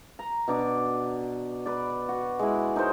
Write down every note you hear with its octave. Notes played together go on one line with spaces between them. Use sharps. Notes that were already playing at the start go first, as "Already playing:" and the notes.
A#5
B2 D4 D6
B4 D5
F#4
G#3 E4
D#4 A#4 C5 C#5